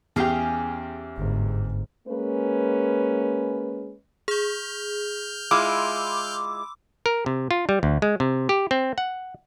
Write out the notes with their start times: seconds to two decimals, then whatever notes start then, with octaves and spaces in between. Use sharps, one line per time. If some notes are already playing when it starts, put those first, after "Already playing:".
0.16 E2 C#4 G4 G#4 F5 G5
1.18 G1 G#2
2.08 G#3 A#3 C#4 B4
4.28 G#4 F6 G6
5.51 G#3 E4 F4 B5 C6 D6 E6
7.06 A#4
7.26 C3
7.51 F4
7.69 G3
7.83 D2
8.02 G#3
8.20 C3
8.49 G4
8.71 C4
8.98 F#5